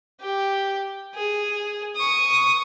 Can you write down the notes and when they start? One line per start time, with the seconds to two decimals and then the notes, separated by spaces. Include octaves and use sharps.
0.21 G4
1.15 G#4
1.96 C#6 D#6